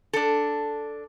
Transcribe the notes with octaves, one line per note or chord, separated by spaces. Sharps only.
D4 A4